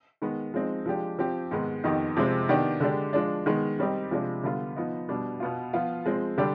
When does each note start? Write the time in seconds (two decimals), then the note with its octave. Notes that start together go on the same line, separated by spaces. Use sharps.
0.22 D#3 G#3 B3
0.54 F3 G#3 C4 D#4
0.86 F3 G#3 D4 G4
1.19 F3 C4 G4
1.51 G#2 D#3 G#3 B3
1.84 F2 D#3 B3 D#4 G4
2.17 C3 F3 G#3 C4
2.49 D#3 B3 D4 G4
2.80 D3 G#3 D4 G4
3.13 F3 G#3 D4
3.46 D#3 G#3 B3
3.79 D#3 G3 C4 D#4 G4
4.11 C3 F3 G#3 D4
4.43 D3 G3 B3 F4
4.76 F3 B3 D#4
5.09 B2 G3 D4
5.40 B2 B3 F4
5.73 F3 B3 F4
6.06 F3 G#3 C4
6.38 D3 G3 D4 G4